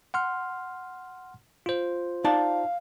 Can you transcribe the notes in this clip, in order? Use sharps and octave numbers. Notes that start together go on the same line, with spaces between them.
F#5 C6 F6
F4 C5
D#4 D5 F5 A5